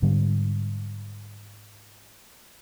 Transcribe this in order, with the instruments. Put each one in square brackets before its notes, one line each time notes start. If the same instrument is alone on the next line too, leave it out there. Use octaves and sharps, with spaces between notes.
[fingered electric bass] G#2 D3 G3